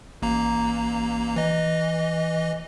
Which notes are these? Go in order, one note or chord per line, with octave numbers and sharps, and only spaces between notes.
A1 A#3 A#5
E3 D#5